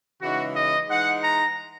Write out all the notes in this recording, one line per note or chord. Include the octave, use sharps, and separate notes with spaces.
C#3 E3 G#3 D#4 F#4
D#5
E3 G#3 D#4 F#5
A#5